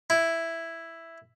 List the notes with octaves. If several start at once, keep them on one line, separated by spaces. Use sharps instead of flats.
E4